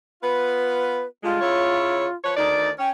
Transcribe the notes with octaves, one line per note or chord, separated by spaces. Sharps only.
B3 F4 B4
D3 G3 G#3 F4
C#3 E4 C#5
F3 B4 C#5
D2 D#3 D#4 D5
C#4 G5